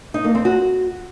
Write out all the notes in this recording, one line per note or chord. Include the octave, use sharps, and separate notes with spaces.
D#4
A#3
C4
F#4